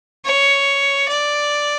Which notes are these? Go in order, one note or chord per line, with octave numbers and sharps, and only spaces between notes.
C#5
D5